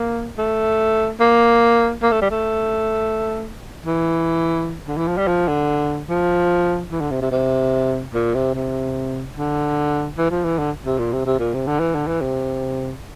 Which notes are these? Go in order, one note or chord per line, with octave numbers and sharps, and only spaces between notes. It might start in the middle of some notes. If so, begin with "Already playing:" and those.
Already playing: A#3
A3
A#3
A#3
A3
G3
A3
E3
D3
E3
F3
G3
F3
D3
F3
E3
D3
C3
C3
C3
A#2
C3
C3
D3
E3
F3
E3
D3
C3
A#2
C3
C3
A#2
C3
D3
E3
D3
E3
C3